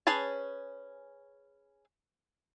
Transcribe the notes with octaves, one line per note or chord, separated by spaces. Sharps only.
C#4 G#4 B4 C#5 A5